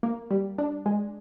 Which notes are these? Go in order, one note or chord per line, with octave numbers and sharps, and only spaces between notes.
A#3
G3
D4
G#3